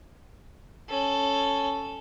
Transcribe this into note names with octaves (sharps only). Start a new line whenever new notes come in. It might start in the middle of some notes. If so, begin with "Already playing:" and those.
C#4 A4